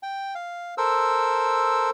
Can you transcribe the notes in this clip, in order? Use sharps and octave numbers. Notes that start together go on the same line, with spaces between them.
G5
F5
A4 A#4 C5 E6